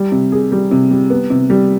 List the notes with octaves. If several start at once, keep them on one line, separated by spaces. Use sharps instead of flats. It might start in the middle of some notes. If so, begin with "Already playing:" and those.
Already playing: G3
C3
G#4
G3
C3
G3
B3
C3
G3